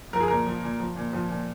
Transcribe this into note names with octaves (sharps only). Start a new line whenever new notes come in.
F3 A#4
G#4
A#2 A#4
F3
A#2
F3
A#2
F3
A#2